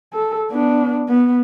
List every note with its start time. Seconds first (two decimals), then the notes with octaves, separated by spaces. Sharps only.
0.14 A4
0.51 B3 D4
1.08 B3